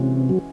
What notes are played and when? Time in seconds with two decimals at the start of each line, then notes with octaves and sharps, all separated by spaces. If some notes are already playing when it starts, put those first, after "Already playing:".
Already playing: C3 E3 G#3 C#4 F#4
0.29 F#3